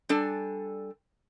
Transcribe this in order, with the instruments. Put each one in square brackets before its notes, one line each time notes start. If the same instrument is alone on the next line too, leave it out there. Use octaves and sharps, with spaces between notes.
[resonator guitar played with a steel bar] G3 D4 A4 G#5